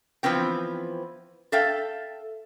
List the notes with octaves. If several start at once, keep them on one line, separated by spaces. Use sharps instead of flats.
E3 F3 B3 C4 G5
A4 E5 F5 G5